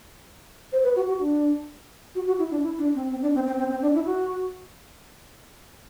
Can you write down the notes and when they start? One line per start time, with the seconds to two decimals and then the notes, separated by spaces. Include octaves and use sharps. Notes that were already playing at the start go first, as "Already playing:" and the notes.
0.72 C5
0.84 B4
0.96 F#4
1.08 F#4
1.20 D4
2.15 F#4
2.27 F#4
2.39 E4
2.51 D4
2.63 E4
2.78 D4
2.95 C4
3.10 C4
3.22 D4
3.35 C4
3.46 C4
3.59 C4
3.70 C4
3.82 D4
3.94 E4
4.06 F#4